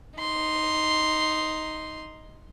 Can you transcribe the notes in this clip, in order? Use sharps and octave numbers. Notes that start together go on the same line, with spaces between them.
D#4 C6